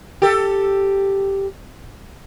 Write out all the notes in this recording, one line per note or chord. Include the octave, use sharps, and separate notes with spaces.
G4 A4